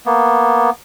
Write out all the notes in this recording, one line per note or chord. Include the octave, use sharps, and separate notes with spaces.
A#3 B3